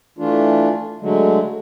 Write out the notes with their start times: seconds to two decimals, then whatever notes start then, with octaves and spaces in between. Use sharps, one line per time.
0.18 E3 A3 D4 F4
1.01 D3 F#3 G#3 A3